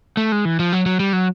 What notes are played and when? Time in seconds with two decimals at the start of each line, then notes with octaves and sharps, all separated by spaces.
0.17 A3
0.32 G#3
0.45 E3
0.59 F3
0.73 F#3
0.86 F#3
1.00 G3
1.13 F#3